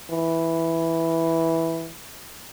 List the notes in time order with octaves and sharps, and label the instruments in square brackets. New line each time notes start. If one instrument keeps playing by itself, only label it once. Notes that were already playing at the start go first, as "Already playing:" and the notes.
[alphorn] E3